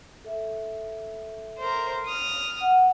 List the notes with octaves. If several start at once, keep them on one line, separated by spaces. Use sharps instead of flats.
A4 E5
A#4 C5
D#6 F6
F#5